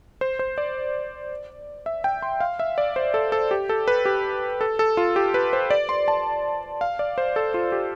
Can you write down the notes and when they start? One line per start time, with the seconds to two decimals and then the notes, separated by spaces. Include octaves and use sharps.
0.21 C5
0.39 C5
0.58 D5
1.86 E5
2.04 G5
2.22 C6
2.40 F5
2.59 E5
2.78 D5
2.96 C5
3.14 A4
3.32 A4
3.51 G4
3.69 A4
3.88 B4
4.05 G4
4.61 A4
4.79 A4
4.97 F4
5.16 G4
5.34 B4
5.53 C5
5.70 D5
5.89 C6
6.08 A5
6.81 F5
6.99 D5
7.18 C5
7.36 A4
7.54 F4
7.72 G4